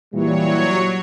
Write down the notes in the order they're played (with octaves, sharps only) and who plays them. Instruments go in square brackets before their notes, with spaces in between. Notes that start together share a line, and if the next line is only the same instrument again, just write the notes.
[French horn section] A#2 E3 G3 [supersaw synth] F#3 C#5